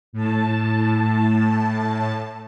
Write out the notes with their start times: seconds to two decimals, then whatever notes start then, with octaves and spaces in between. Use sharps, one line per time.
0.13 A2 A5